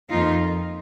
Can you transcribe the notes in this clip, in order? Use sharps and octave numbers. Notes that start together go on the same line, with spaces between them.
F2 F3 A#3 D#4 F4